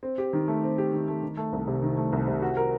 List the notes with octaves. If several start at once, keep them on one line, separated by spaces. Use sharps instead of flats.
C4
G4
D#3
A3
C4
G4
D#3
A3
D#3
A3
C2
C3
D#3
A3
C2
C3
F#4
A#4